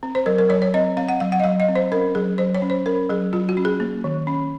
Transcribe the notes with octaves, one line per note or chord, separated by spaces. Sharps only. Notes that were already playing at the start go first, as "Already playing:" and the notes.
C4
C5
F#3 A#4
A#4
F#3 C#5
C#5
C4 D#5
C4 F5
F#5
F#3 F5
F#5
D#5
F#3 F5
D#5
C4
C5
C#4 A#4
F#3 G#4
F#3 C5
C#5
C#4
C5
C#4 A#4
F#3 G#4
F#3 F4
F#4
C#4
G#4
A#3
D#3
C#4